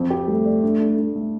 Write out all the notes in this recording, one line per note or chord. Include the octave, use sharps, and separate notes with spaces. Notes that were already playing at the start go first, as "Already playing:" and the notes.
Already playing: F2 C4
G4
G3 A3
D5
D4
D4
D4
A3